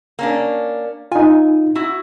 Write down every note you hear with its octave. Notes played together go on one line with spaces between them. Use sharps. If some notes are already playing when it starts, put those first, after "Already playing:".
A#3 C#4 D4
D#4 F4 G#5
E4 F#4